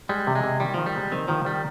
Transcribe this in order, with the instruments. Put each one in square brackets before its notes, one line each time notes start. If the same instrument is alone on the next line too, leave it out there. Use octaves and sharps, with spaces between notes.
[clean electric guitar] G3 [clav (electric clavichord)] G#3
[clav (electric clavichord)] C3
[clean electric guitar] G#3
[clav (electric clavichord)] C3
[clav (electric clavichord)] D#3 [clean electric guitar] G3
[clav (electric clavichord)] D#3 [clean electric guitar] F3
[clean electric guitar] G3
[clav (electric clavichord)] G#3
[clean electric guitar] D#3 [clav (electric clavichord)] C4
[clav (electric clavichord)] D#3 [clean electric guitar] F3
[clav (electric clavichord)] D#3 [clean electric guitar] G3